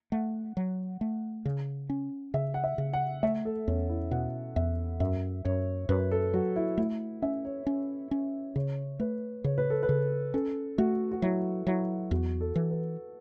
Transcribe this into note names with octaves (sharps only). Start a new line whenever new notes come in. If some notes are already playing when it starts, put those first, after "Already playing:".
A3 F#5
F#3
A3
C#3
C#4
C#3 E5
F#5
E5
C#3
F#5
A3 E5
A4
E2 C#4
E4
B2 F#5
E2 E5
F#2 E5
F#2 C#5
F#2 B4
A4
F#3 F#4
E4
A3 E4
C#4 E5
C#5
C#4
C#4
C#3 C#5
A3 B4
C#3 C#5
B4
A4
B4
C#3
C#4 A4
A3 F#4
F#4
F#3 E4
F#3 E4
E2 F#4
A4
E3
B4